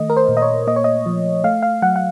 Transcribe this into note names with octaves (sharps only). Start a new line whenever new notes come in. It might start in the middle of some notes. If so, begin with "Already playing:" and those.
Already playing: D#3 A3 D#5
A#4
C5
A#2
D#5
C#5
A#3 D#5
C#5
D#5
F3
A3 F5
F5
F#3 F#5
F#5